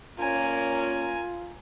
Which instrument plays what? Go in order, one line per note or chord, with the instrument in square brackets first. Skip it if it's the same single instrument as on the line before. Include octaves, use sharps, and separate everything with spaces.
[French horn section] A#2 A#3 C#4 [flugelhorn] F4 [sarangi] A#4 [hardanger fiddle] G#5